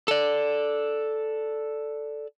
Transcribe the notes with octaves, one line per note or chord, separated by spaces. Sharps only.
A4 D5